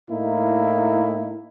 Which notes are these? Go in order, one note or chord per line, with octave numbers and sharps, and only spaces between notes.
A2 A#3 D#4 E4